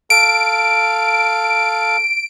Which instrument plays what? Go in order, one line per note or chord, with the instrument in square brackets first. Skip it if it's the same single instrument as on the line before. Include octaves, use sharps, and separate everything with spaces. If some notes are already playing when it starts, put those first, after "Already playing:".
[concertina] A4 F5 [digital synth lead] D7